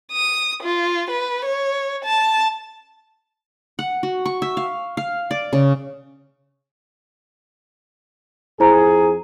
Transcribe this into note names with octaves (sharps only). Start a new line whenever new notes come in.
D#6
F4
B4
C#5
A5
F#5
F#4
C#6
E5
F5
F5
D5
C#3
F2 E4 G#4 C5 A#5